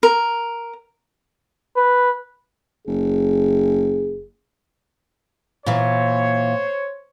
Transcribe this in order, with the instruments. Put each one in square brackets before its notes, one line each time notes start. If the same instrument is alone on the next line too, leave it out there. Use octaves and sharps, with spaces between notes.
[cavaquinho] A#4
[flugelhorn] B4
[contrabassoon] F#1 [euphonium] G#4
[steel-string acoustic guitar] A#2 E3 [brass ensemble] C5 C#5